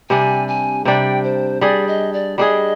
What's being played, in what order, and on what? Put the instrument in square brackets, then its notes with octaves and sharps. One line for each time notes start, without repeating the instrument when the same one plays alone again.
[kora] C3 G3 D4 [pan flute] G#5
[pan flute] G#5
[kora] C3 G3 D4 [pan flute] G5
[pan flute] C5
[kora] G3 D4 G#4 [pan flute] D5
[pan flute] D#5
D5
[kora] G3 D4 G#4 [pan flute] D#5